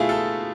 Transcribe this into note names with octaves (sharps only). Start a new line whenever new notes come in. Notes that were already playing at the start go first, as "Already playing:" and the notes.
Already playing: B2 A3 E4 F4 G#4
A4